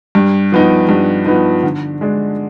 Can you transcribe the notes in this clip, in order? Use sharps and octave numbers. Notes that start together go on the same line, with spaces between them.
G2
F3 B3 D#4
G2
F3 B3 D#4
D3
G#3 D4